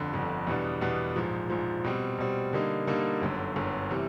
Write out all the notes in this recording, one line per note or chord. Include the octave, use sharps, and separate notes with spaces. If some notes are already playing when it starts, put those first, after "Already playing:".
Already playing: G1 F2 D3
G1 F2 D3
E2 B2 G3 B3 D4
E2 B2 G3 B3 D4
A#1 G#2 F3
A#1 G#2 F3
B2 G3 C4
B2 G3 C4
D3 G3 A#3 D#4
D3 G3 A#3 D#4
G1 F#2 D3
G1 F#2 D3
C3 E3 G3